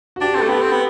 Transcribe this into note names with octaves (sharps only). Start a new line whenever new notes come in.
F#4
D4 G4
C4 A4
A3
B3 G4
C4
B3